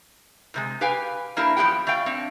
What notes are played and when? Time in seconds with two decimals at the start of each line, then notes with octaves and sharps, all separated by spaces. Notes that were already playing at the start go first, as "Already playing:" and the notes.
0.54 A2 C3 G#3
0.81 G4 B4 F5 G5 G#5
1.36 E3 A#3 D4 E4 G4
1.57 E2 F3 A#3 B3 G4 G5
1.87 A3 D5 F5 G5
2.06 C4 D4